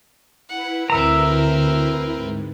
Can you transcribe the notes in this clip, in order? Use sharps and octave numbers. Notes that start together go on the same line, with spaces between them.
E4 B4 F#5
D2 D3 C4 A#4 E5 A#5
G#2